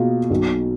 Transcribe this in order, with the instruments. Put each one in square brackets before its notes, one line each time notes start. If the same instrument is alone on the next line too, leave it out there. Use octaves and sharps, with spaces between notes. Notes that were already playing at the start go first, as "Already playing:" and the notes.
Already playing: [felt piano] B2 A#3 F4 G#4
B1 B2 F#3